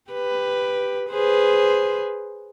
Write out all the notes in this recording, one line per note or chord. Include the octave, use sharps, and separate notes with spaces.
G4 B4
G#4 B4 C5